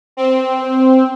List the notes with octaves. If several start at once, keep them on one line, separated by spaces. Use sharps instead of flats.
C4